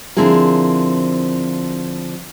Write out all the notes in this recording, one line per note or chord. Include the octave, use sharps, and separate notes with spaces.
D3 F3 C4 E4 G#4 A#4